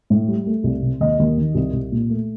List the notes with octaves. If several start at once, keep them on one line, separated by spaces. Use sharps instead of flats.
A2
G3
A3
C2
C3
D#2 D#5
D#2
D#3
C2
C2
A#2
A3